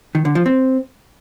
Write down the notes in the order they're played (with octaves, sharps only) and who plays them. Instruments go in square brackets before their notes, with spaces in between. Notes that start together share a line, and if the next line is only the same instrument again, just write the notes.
[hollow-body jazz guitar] D#3
D3
F3
C4